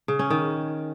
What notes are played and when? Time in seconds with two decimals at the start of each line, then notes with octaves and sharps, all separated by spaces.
0.08 C#3
0.19 C#4
0.30 D#3